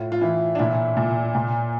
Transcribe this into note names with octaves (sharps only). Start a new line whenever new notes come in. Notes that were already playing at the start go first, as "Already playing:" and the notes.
Already playing: A2 F4
F4
E3 E4
D4
A#2 E4
A#2
A#2